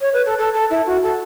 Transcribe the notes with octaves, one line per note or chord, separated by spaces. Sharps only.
C#5
B4
A4
A4
A4
E4
F#4
A4